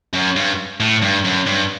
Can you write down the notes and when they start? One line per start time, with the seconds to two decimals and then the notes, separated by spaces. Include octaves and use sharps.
0.14 F#2
0.36 G2
0.80 A2
1.02 G2
1.25 F#2
1.47 G2